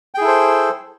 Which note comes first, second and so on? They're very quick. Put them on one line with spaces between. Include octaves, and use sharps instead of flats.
G5 G#4 E4 A4 C5